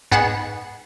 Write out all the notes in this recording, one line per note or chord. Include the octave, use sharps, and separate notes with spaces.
G#2 B3 G#4 F#5 E7